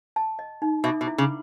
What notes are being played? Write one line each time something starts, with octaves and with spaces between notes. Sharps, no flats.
A5
D#5
D#4
B2 E5
B2
E4
C#3